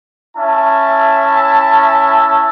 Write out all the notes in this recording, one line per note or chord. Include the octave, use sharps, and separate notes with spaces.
C#4 E4 E5 A5